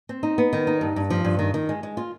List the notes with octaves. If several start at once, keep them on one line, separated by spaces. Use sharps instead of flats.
C4
D#4
B3
D#3
D#4
G2
G2
F3
G2
D#3
D#3
G#3
G#3
F4